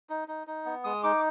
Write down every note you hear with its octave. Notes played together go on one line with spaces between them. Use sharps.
D#4
D#4
D#4
B3
G#3 D#6
D#4 D6